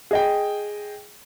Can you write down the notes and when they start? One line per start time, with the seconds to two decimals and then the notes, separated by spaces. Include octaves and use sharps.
0.11 G#4 D#5 G5